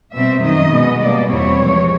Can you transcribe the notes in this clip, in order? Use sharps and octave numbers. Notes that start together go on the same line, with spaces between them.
B2 G3 C4 E5
F#2 D#3 F#3 D#5
B2 G#3 B3
B2 G3 A#3 D5
E2 B2 G3 C4 E4 C#5
C3 F3 G#3 C4